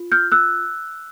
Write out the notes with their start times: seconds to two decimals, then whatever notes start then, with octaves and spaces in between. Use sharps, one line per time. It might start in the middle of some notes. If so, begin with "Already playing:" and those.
Already playing: F4
0.12 F6 G6
0.32 E6 F#6